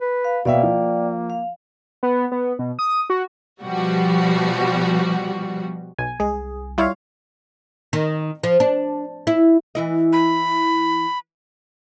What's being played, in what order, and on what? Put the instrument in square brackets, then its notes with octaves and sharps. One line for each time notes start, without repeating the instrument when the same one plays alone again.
[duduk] B4
[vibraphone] F5
[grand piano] B2 E5 [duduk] A#3 [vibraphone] D5 F5 G5
[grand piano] F3
[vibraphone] F5
[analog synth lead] B3
B3
B2
D#6
F#4
[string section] B2 F3 G3 F#4
[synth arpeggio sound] B1 [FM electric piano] G#5
[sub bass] C2 [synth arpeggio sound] G#3 [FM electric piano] G#4
[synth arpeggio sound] G3 E4 [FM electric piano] F4 C#5 F5
[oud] D#3
F3
D4
E4
E3 E4 D#5
[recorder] B5